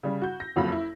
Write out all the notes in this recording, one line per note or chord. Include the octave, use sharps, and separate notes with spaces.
C#3 G3
F#4 G6
A#6
F#1 F2 F#3 F5 B5
E4